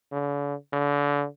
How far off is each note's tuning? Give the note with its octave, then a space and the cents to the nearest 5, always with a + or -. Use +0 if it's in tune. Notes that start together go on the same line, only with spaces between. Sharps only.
D3 -45
D3 -30